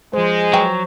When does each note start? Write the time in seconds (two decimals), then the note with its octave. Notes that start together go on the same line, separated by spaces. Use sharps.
0.13 F3 G#3 C5
0.53 F#3 B4 G5 G#5